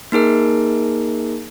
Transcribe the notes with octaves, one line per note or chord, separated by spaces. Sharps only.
A#3 D#4 G#4 A#4